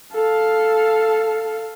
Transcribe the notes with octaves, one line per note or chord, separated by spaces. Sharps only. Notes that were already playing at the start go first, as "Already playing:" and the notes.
A4 F5